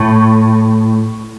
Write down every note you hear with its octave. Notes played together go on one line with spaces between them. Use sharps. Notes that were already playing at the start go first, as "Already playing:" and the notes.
Already playing: A2